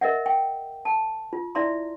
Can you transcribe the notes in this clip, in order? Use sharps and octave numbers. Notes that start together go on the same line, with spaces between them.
A#4 D#5 E5 F#5
G5
A5
F4
E4 D5 E5 A#5 C6